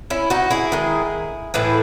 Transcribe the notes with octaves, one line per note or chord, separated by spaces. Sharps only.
C#4 E4
D#4 F#4
E4 G#4
D#3 G#3
A2 E3 A3 E4 G#4